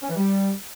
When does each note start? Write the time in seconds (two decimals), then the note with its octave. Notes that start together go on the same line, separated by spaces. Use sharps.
0.03 C#4
0.09 E3
0.16 G3